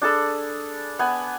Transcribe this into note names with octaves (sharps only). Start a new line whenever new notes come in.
D4 G#4 A4 B5
B3 G#5